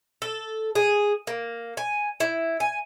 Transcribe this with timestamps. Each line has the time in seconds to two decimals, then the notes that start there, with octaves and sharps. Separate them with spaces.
0.22 A4
0.75 G#4
1.27 A#3
1.77 G#5
2.20 E4
2.60 G#5